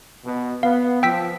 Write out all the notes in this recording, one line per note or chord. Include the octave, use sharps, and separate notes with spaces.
B2
B3 F5
F3 G5 E6 B6